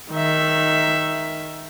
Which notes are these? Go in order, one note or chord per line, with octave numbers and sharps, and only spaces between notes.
D#3 E5